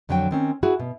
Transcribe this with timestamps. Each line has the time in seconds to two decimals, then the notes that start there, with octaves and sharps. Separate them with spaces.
0.09 F2 D3 F#3 C#5 G5
0.31 D#3 C4 C#4
0.63 E4 F#4 G#4
0.80 B2